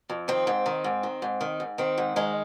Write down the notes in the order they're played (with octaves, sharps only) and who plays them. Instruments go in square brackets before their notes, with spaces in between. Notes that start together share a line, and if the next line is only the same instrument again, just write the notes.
[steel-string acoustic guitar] F2
D#3 C4
G#2
D#3
G#2
D#3
G#2
D#3
G#2
D#3 C4
G#2
D#3 G#3